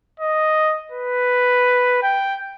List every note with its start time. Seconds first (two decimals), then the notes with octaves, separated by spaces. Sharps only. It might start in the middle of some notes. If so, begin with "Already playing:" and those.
0.20 D#5
0.92 B4
2.03 G5